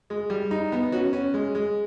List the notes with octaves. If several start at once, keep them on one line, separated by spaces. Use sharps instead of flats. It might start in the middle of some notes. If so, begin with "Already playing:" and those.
G#3
G3
D#4
B3
C#4 F#4
C#4
G#3
G#3